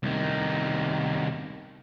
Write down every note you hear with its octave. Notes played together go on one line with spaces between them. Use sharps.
C2 D#3